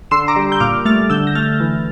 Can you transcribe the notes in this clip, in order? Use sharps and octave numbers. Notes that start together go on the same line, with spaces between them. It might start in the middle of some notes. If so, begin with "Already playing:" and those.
D3 C6 E6
A#5 D6
G3
G6
A#2 D6 F6
A3 F6 A6
D3 E6 G6
A#6
A3 F6 A6
E3